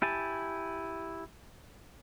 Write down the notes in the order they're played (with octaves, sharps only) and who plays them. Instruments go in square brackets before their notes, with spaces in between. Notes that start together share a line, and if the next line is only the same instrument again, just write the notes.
[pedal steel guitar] E4 G4 G#5 A5